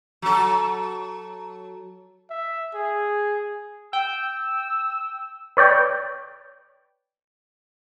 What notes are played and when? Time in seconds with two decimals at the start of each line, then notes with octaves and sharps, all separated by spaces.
0.22 F#3 A4
2.30 E5
2.75 G#4
3.93 G5 E6
5.57 B4 C#5 D5 G5